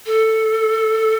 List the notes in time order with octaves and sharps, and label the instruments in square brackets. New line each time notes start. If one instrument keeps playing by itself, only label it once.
[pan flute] A4